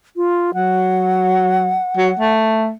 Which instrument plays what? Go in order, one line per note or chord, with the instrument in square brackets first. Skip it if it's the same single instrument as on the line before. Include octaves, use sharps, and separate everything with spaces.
[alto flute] F4
[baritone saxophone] F#3 [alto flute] F#5
[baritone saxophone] F#3
A3